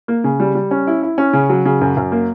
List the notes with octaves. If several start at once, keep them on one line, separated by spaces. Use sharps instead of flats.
A#3
C#3
G3
G3
C#4
E4
E4
C#4
C#3
F#3
C#3
F#2
F#2
A#3